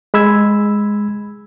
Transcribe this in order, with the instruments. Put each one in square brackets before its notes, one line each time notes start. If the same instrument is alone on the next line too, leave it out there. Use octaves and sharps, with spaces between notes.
[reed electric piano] G#3 B5 E6 G#6